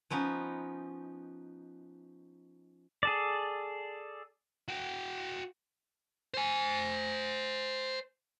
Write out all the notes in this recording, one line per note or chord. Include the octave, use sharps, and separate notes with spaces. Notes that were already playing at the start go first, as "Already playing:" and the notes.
F3 B3 C#4 D#4
G#4 A4 D5
F#4 G5
C5 G#5